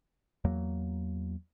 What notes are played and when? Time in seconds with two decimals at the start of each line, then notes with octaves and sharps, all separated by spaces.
0.45 E2 F#3 A#3